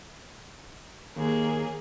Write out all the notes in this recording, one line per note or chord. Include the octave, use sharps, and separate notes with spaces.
D#2 A#3 G#4